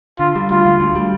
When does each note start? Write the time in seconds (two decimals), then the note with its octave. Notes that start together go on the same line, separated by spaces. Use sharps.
0.19 D3 F4
0.36 G3
0.50 D2 F4
0.66 D2
0.80 D2
0.95 G3